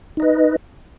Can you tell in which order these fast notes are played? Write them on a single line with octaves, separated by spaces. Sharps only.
D#4 D#5 B4